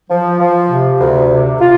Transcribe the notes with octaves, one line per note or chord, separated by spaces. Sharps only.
F3
F3
C3
D2
C3
F4